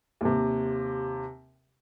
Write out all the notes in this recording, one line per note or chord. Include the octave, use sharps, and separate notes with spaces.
D#2 C3